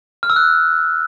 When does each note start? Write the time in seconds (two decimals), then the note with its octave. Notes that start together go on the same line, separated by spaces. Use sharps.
0.23 F6
0.30 E6
0.36 F#6